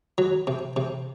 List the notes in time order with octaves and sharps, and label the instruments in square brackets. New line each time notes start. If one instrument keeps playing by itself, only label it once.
[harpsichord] F#3
C3
C3